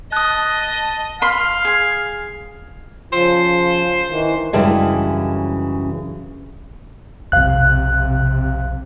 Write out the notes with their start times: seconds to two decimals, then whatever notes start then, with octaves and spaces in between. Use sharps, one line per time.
0.12 D#5 A5 D#6 F#6
1.22 F5 B5 C6
1.65 G#4 G#5
3.13 C#3 F3 F4 C5
4.09 D#3 E3
4.53 F#2 C#3 E3 G3 G#3 D4
7.32 B1 F2 C3 F5 F#6